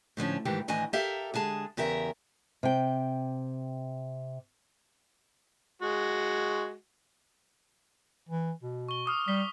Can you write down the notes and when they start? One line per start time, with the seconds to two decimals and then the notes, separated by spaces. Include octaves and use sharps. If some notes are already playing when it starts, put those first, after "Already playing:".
0.17 A2 D3 F3 C#4
0.45 G#2 D#3 E3 G4
0.68 A2 D#3 E3 D4 D#5 G#5
0.93 G4 A4 A#4 E5 F5
1.34 D3 G#3 G#4 A5
1.77 E2 C#3 G4 A#4 E5
2.63 C3 G5
5.82 G#3 F#4
8.29 E3
8.63 B2
8.88 C#6 G7
9.06 D6 D#6 F6
9.28 G3 B6 G7